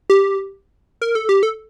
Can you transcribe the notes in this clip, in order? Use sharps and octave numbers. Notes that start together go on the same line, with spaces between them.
G4
A#4
A4
G4
A4